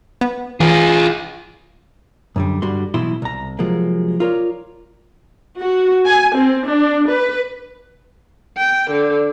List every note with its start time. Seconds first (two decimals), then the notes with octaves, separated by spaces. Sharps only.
0.21 B3
0.60 E3 F4 G#4
2.36 F#2 D3 G3
2.62 G2 D3 G3 F#4 C6
2.94 B1 B2 E3 E4 C6
3.22 C2 A#5
3.59 C3 F3 F#3 G#3 A#3
4.20 F4 A#4 C#5 D5
5.59 F#4
6.06 G#5
6.36 C4
6.68 D4
7.10 B4
8.58 G5
8.90 D3